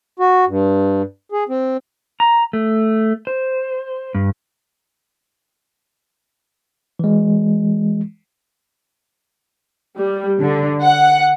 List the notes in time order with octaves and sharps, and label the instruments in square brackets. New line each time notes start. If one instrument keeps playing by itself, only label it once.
[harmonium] F#4
G2
G#4
C4
[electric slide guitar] A#5
A3
C5
G2
[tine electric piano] E3 G#3
[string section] G3
D3
F#5